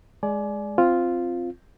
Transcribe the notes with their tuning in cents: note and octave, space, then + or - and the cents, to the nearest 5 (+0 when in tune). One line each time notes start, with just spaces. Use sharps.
G#3 +0 D5 +0 G#5 +30
C4 +0 F4 +0